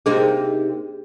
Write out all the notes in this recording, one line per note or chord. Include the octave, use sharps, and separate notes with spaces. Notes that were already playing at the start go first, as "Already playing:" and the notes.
C3 A#3 D4 D#4 G#4